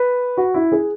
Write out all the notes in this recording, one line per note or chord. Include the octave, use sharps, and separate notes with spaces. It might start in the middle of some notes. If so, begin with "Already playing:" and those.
Already playing: B4
F#4
E4
G#4